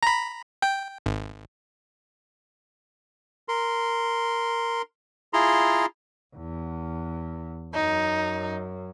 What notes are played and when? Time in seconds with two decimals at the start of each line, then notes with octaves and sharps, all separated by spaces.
0.03 A#5 B5
0.62 G5
1.06 G#1
3.48 A#4 C6
5.33 E4 F4 G#4 A#5 C6
6.36 E2
7.74 F#2 D#4